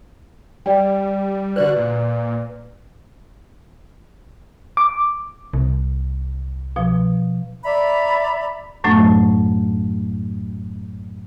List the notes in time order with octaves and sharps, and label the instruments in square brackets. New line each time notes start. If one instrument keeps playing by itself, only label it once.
[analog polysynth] G3 [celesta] D5 G5
[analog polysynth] D3 F#4 F#6 [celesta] B4 D5
[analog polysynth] A#2
[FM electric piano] D6
[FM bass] C2
[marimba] B2 F3
[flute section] D5 E5 A#5 B5
[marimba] F#2 A2 F#3 A3 B3 D4